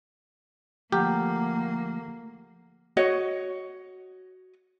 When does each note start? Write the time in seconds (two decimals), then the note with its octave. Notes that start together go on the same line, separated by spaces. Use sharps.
0.92 D2 F3 A3 A#3 G4 F#5 A#5 F6
2.97 F#4 C#5 D#5